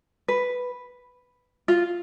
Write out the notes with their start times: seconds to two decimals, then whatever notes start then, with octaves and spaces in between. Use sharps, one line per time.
0.28 B4
1.68 F4